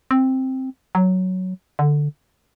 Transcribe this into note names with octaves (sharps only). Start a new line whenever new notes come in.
C4
F#3
D3